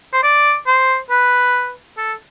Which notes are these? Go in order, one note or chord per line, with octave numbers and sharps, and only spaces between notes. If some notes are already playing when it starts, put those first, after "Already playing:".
C5
D5
C5
B4
A4